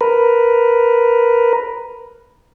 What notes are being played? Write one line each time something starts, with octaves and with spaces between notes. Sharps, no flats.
A#4 B4